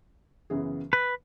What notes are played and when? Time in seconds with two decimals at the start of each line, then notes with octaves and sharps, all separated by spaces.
0.50 F#2 C#3 E3 B3 G#4
0.93 B4